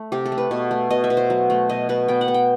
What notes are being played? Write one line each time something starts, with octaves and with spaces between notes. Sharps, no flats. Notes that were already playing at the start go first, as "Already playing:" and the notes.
Already playing: A3
C3 G4
A4
A3
B4
B2
A3
B2 D#5
E5
B2
C5
F#3
A3
B2 D#5
B2 B4
B3 G5
F#5
B3
G5